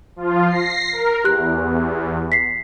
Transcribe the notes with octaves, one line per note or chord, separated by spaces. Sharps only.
F3 F4
A#6 C7
A#4
E2 G4 F#6
B6 C7